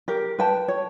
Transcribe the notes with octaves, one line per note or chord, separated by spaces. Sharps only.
G4 A#4
B4 G5 A5
C#5